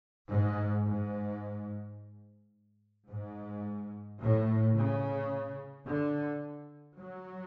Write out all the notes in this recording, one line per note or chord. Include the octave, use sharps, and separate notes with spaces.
G#2
G#2
G#2
A2
C#3
D3
F#3